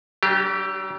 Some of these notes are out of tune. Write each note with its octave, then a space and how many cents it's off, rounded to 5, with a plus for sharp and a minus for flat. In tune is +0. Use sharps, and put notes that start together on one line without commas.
F#3 +45 D4 +0 G4 +0